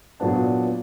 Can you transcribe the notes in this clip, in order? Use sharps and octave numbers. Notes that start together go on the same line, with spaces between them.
A#2 F#3 B3 D4